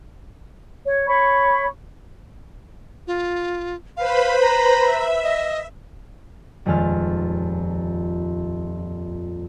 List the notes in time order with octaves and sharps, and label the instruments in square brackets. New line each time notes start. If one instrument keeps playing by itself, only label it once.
[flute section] C#5
C#5 B5 C#6
[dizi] F4
[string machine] B4 C5 B5 [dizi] F5
[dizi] A#5
[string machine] E5
[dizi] D#5
[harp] D#1 F2 G#3 G#4 A5 F6